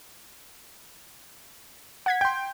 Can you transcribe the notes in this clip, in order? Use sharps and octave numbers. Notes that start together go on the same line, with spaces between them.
F#5 G#6 B6
G5 C6 G6